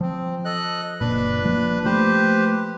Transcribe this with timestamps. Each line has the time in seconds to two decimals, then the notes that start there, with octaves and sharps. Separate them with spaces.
0.01 F3 C4
0.45 A4 D#5 F#6
1.01 F#1 A#2 D4 B4 B5
1.45 F3 A#3
1.85 F3 A3 G4 B4 C5